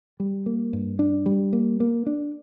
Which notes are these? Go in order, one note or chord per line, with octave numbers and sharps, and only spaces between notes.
G3
A#3
G2
D4
G3
A#3
A#3
D4